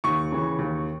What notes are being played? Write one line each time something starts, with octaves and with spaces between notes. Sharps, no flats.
D#2 C#6
C#3 E3
D#2